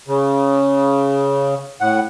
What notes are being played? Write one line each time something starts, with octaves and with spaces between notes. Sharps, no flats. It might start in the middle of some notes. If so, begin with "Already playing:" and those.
C#3
A2 F#5